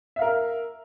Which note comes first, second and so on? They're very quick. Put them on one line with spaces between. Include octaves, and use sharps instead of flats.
E5 F5 A#4